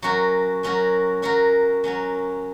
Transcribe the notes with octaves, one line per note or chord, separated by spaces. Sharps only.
F#3 C#4 F#4 A#4
F#3 C#4 F#4 A#4
F#3 C#4 F#4 A#4
F#3 C#4 F#4 A#4